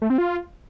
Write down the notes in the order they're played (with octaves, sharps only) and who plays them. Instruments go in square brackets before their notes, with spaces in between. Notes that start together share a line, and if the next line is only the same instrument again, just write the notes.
[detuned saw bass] A3
C4
F4